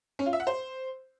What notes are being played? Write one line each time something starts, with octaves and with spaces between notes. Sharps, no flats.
C#4
F4
E5
F#5
C5